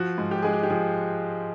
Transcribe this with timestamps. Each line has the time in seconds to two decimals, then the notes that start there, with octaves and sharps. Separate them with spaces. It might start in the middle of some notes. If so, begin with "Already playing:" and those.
Already playing: F3 F#4
0.18 G#2
0.31 G4
0.42 G#3 G#4
0.53 G4
0.63 G4
0.70 F3 G#4